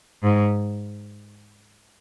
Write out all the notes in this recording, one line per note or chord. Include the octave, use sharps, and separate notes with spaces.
G#2